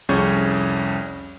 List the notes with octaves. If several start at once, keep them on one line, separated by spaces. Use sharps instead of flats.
C2 F2 C#4 G#4 C#6 G6